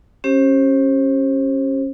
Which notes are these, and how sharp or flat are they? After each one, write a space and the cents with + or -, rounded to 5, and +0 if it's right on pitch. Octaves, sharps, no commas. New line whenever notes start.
C#4 -20 G4 +0 C5 +30